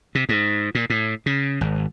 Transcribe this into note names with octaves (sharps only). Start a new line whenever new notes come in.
C3
G#2
A#2
A2
C#3
G#1